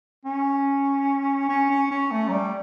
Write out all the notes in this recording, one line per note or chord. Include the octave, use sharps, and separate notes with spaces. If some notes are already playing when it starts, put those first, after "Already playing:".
C#4
C#4
C#4
C#4
A3
F#3
G3